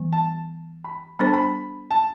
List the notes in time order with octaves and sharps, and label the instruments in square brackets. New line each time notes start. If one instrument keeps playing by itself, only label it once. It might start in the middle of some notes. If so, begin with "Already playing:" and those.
Already playing: [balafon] E3 G3 B3
[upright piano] A5
B5
[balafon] G3 B3 D4 A4 C5 [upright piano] B5
[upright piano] A5
B5
A5